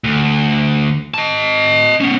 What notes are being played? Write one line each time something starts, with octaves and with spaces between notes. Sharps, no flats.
D2
D#5 A5
B3 C#4